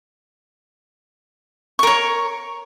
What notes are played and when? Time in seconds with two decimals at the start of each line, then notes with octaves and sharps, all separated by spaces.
1.79 C#6
1.83 A#4
1.87 C#5